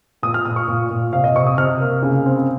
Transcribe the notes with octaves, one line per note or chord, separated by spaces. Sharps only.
A#2 D#6
F6
A#2 D#6
C#6
A#2
A#2
C3 F5
D#5
C3 C#6
D#6
C3 F6
A#3
C#3
C4